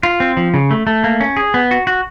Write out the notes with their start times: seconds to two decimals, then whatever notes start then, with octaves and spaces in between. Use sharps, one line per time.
0.03 F4
0.20 C4
0.37 F3
0.54 C#3
0.71 A3
0.87 A3
1.04 A#3
1.20 C#4
1.37 G#4
1.54 B3
1.71 F#4
1.87 F#4